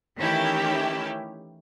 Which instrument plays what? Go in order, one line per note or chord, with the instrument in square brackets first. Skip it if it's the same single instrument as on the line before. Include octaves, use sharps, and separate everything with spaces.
[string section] D#3 E3 A3 C#4 E4 G4